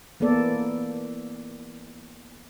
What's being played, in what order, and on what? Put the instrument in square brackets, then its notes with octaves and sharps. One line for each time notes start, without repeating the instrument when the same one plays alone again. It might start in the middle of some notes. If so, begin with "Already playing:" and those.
[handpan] E3 A#3 B3 A4 D5